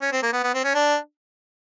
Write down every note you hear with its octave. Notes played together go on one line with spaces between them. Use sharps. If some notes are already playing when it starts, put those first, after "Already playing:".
C#4
C4
A#3
B3
B3
C4
C#4
D4